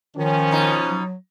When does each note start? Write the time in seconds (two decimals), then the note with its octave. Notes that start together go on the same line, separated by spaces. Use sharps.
0.16 D#3 F3 C#4
0.51 B2 D#4
0.89 F#3